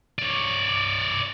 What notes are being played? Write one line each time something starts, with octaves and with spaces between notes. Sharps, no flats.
C#5 D5